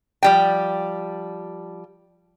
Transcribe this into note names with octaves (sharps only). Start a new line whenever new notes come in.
F3 G3 G5